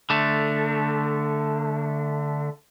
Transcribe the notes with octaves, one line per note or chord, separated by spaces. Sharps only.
D3 A3